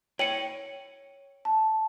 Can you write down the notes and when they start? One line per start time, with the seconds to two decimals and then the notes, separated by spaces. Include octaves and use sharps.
0.19 C#5 G5 C#7 D#7 F#7
1.45 A5